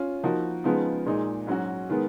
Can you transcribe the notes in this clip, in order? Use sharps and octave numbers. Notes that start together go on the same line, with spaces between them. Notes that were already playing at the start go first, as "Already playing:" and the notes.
Already playing: C#4 F4
F3 A#3 D#4 F#4
C#3 F3 G#3 B3 D#4
A#2 G#3 D#4
G#2 F#3 C#4 F#4
D#3 G#3 B3